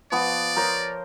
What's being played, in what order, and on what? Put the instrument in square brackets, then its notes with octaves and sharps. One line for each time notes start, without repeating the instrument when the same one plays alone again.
[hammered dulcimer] F3 B3 C#6 [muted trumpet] D5
[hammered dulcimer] A#4 C5 C#5